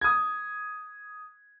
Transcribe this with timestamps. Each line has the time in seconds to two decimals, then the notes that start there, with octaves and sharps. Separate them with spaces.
0.01 D#6 G#6